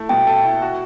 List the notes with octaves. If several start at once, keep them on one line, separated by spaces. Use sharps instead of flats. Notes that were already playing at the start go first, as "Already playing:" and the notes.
Already playing: A3 E4
B2 G5
A4
E4
F#4